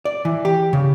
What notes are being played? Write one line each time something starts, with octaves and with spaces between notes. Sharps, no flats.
D5
E3
G4
C#3